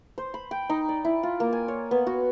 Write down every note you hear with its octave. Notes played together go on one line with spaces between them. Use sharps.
C5
B5
G5
D#4
D5
E4
F4
A#3
G#5
C#5
B3
F#4